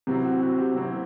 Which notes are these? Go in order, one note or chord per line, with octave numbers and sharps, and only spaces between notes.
C3 F#3 C4 E4 G4
F#4
F#4
G4
C3 F#3 C4 E4